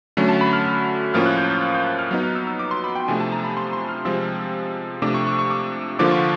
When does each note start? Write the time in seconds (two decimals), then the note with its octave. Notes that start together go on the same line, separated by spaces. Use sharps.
0.17 D3 F#3 A3 C#4
0.29 A5
0.41 B5
0.53 F6
0.65 F6
1.14 A2 F3 A#3 C#4 F4 F6
1.26 F#6
1.38 G6
1.50 G6
1.62 F#6
1.75 G6
1.87 F#6
1.99 F6
2.11 F#3 B3 D#4 F6
2.23 F6
2.35 E6
2.47 E6
2.59 D6
2.71 C6
2.84 B5
2.95 G5
3.08 C3 F3 A3 D4 G#5
3.20 A5
3.32 A#5
3.44 B5
3.57 C6
3.73 C6
3.89 F6
4.05 C3 F3 G#3 C4 E6
5.02 C3 F3 A3 D4 D6
5.14 C#6
5.27 C#6
5.39 C#6
5.50 D6
5.99 D3 F3 A#3 D4 F4 D6
6.11 C#6